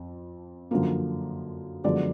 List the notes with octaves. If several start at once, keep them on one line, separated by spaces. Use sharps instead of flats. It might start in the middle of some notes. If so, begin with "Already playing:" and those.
Already playing: F2 F3
F#2 D3 F3 A#3
F#2 D3 F3 G#3 B3 D5